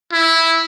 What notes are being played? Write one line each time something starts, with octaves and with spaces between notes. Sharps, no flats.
E4